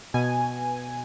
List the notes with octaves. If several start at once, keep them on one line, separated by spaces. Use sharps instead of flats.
B2 G#5
B2